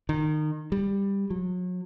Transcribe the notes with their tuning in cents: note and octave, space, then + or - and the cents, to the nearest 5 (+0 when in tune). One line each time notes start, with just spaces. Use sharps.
D#3 -25
G3 +15
F#3 -35